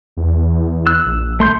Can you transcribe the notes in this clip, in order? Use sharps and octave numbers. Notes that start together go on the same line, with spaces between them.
E2
E6 F#6
A#1
A3 C6 G6